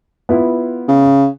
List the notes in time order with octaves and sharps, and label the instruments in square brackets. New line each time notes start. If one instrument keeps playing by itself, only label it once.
[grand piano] B3 E4 F4
[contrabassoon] C#3